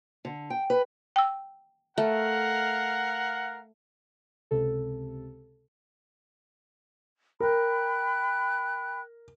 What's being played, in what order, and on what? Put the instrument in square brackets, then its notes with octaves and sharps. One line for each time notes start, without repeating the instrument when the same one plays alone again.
[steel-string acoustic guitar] D3
G5
B4
[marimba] G5 E6
[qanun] A3 [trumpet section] A#4 F5 F#5
[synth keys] C#2 C3 A4
[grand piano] A#4 [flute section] G5 B5 F#6